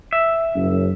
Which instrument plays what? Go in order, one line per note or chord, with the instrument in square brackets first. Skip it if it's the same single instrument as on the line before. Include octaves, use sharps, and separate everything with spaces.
[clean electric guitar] E5
[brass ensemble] F#1 F#2